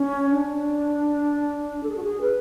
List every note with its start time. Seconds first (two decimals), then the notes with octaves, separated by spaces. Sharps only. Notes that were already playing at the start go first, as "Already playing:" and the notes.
Already playing: C#4
0.30 D4
1.83 A4
1.89 G#4
1.97 F#4
2.04 G#4
2.21 B4